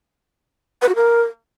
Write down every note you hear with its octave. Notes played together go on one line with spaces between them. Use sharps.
B4
F#4
A#4